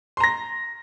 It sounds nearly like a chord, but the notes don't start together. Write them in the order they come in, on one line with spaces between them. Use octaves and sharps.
C6 A#5 A#6